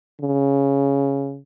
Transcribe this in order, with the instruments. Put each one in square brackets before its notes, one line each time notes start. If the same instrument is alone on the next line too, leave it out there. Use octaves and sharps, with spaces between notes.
[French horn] C#3